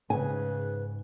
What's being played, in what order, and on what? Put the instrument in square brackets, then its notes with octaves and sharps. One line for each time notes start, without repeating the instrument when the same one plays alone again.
[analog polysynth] G#2 [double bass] C#3 [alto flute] B4 [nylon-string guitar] G#5